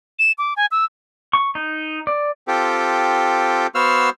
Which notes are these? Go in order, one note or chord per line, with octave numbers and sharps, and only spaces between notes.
E7
D6
G#5
E6
C#6
D#4
D5
C4 F4 G4 A4
B3 F#4 C5 F5 E6 F6